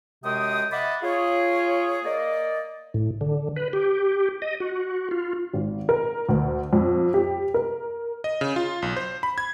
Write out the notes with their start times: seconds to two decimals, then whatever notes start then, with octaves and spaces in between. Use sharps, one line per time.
0.23 F#2 C3 G#3 G5 D#6
0.72 D#5 E5 F#5 A5 B5 D6
1.03 F4 G#4 C#5
2.04 A#3 D5 D#5
2.94 A2
3.21 D3
3.56 B4
3.73 G4
4.42 D#5
4.60 F#4
5.11 F4
5.54 G#1
5.89 A#4
6.29 D2
6.73 F2
7.14 G4
7.54 A#4
8.24 D#5
8.41 C#3
8.56 F4
8.82 B1
8.96 C5
9.23 B5
9.38 G#6